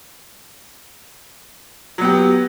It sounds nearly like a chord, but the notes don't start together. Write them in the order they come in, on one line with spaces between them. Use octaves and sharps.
F#3 B3 G4